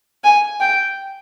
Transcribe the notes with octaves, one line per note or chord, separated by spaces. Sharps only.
G#5
G5